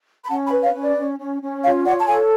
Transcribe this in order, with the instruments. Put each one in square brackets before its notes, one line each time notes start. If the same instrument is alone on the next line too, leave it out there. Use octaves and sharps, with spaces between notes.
[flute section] B5
C#4 F#5 A5
G#5 B5
B4
C#5 F5
C#4
D5
C#4
C#4
C#4
F4 C#5 F5
C#5 D5 F#5
A5
A4 F5 G#5